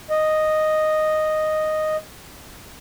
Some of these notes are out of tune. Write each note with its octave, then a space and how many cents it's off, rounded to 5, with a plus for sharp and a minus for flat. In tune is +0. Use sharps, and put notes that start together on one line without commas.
D#5 -5